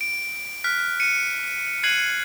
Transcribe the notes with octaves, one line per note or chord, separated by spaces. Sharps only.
D7
F6 F#6 B6
C#7 D#7
F#6 G#6 C7 C#7 D#7 F#7